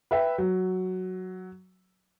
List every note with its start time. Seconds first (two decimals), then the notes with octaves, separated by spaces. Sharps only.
0.11 B4 E5 G5
0.38 F#3